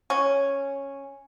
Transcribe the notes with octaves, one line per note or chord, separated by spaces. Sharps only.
C#4